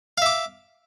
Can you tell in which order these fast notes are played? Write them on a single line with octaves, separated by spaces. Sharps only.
F5 E5 D6